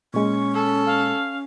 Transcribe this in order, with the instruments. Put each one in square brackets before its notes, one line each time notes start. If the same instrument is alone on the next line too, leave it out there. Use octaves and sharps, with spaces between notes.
[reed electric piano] A#2 G#3 [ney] C#4 [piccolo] C#6
[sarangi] A4
[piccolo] F5